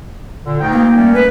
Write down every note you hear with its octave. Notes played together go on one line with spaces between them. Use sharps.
A#2 D3
D2 D#4 G5
A#3
G3 A3 C#4
B4